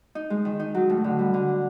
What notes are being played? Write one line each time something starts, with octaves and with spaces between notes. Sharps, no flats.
D#4
G#3
D#3
D#4
F#3
A2
D3
G3
D3
D4